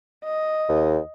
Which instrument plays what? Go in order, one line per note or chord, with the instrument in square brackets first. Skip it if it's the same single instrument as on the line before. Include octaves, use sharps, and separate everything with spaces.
[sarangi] D#5
[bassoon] D#2